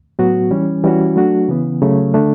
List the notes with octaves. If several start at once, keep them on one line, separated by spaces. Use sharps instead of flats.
A2 F#3 B3 F#4
E3 G3 C#4
E3 G3 C#4 F#4
F#3 A3 D4 F#4
C#3 E3 B3
C#3 F#3 A3
D3 A3 D4